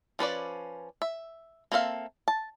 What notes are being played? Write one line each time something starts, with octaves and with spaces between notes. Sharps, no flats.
F3 C#4 B4 D5
E5
A#3 C4 A4 E5 F5
A5